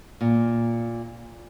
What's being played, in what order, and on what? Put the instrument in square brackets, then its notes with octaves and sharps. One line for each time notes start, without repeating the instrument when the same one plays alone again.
[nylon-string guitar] A#2